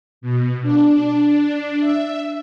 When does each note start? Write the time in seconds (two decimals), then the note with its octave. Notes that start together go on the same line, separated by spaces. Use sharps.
0.21 B2
0.62 D4
1.80 E5